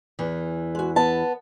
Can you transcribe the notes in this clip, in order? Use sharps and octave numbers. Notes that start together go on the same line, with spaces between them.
E2 E3
G#3 F#4
B3 A5